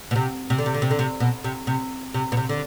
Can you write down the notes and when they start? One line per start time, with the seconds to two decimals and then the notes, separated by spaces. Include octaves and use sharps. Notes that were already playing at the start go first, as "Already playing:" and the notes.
0.11 B2
0.16 C3
0.50 C3
0.58 D3
0.66 C3
0.74 D3
0.82 C3
0.91 D3
0.99 C3
1.20 B2
1.44 C3
1.67 C3
2.14 C3
2.32 B2
2.37 C3
2.49 D3